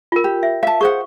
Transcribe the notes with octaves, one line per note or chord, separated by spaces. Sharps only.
F4 A#4
G4
E5
E5 F5 A5
G#4 C5 F#5 C#6